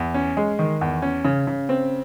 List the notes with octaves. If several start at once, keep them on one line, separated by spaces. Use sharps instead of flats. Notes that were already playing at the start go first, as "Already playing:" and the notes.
Already playing: E2
C#4
G#3
D#3
E2
C#4
C#3
C#3
C4